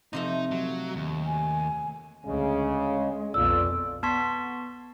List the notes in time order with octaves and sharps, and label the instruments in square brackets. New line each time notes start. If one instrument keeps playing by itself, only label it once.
[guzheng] C3 F3 A3 [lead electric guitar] D#4
[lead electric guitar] F#3
D#2
[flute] G#5
[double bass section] D2 [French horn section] C#3 [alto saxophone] G#3
[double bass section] B1 F2 B3 [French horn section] F4 A4 D5 [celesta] E6
[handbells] B3 A5 C6 C#6 B6